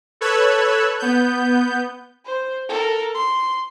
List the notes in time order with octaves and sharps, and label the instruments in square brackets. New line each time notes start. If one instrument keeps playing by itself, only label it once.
[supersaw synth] A4 B4 C#5 E6 F#6 G#6
B3 G6
[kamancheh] C5
A4 A#4
C6